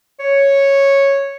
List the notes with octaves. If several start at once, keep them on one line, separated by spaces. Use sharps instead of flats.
C#5